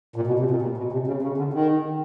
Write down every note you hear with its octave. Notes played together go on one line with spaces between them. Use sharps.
A#2
B2
C3
A#2
A#2
B2
C3
C#3
C#3
D3
D#3